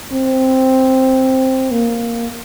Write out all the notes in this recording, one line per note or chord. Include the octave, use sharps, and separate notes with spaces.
C4
A#3